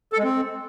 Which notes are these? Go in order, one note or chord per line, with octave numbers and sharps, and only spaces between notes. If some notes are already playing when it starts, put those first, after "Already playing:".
A4
G#3
C4